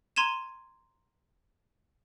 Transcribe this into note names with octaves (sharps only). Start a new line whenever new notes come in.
A#5 C6 G#6 D#7 E7